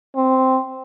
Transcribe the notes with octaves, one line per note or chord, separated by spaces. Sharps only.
C4